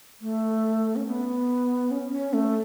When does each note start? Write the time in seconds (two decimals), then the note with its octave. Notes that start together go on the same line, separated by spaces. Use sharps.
0.21 A3
0.96 C#4
1.07 B3
1.91 C#4
2.12 C#4
2.33 A3